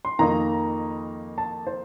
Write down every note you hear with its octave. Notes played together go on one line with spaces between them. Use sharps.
C6
F2 D#3 A#3 D#4 A#5
A5
C5